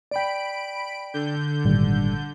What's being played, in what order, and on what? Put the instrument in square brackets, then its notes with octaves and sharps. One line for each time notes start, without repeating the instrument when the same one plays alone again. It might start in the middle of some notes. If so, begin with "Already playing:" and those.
[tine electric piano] D5 G5 [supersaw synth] B5 D7
[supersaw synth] D3 G6
[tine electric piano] G#1 A#2 G3